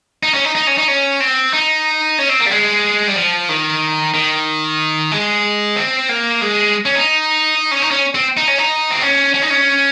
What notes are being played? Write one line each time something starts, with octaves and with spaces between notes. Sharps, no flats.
D#4
C#4
D#4
D#4
C#4
D#4
C#4
C4
D#4
C#4
C4
A#3
G3
G#3
G3
F3
D#3
D#3
G#3
C4
A#3
G#3
C#4
D#4
C#4
D#4
C#4
C4
D#4
C#4
D#4
C4
C#4
C#4
D#4
C#4